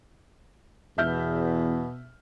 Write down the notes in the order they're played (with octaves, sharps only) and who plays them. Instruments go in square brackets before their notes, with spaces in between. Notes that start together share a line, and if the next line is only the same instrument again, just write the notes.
[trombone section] E2 [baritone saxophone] B2 [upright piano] E5 F6 G6